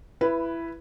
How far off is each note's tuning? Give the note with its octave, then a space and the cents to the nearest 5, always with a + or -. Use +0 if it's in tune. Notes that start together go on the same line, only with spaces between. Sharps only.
E4 +15 B4 +0